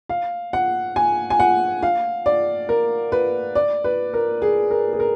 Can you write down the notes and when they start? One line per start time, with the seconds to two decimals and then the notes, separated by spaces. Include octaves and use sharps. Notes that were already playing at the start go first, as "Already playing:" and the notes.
0.09 F5
0.53 F#5
0.96 G#5
1.30 G#5
1.40 F#5
1.83 F5
2.26 D5
2.69 A#4
3.12 B4
3.55 D5
3.84 B4
4.14 A#4
4.42 G#4
4.71 A#4
4.93 G#4
5.00 A#4